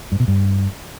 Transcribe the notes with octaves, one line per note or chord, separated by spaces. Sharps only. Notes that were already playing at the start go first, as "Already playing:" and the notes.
G2
B2
G2